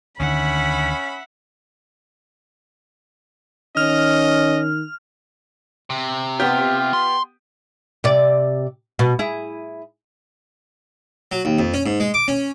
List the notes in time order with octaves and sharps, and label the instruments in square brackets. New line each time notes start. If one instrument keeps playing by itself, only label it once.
[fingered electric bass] D2 D3 D#3 [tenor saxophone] C#4 [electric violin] E5 F#5 [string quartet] B5
[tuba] D#3 [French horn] C#4 [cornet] D#5 [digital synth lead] F6
[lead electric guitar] C3
[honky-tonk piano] B3 G4 [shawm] F4
[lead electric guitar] C6
[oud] C3 D5
B2
E4 G#4
[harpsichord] F#3
D#2
F2
C#4
G#2
G#3
D6
C#4